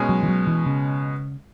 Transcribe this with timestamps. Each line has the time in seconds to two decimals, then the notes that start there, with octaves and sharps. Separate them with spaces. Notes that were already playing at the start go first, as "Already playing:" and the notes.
Already playing: B2 G#3 C#4
0.09 F#3
0.23 E3
0.28 F#3
0.47 E3
0.67 C#3